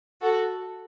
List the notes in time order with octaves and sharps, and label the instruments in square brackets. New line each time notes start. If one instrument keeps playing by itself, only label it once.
[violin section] F#4 A4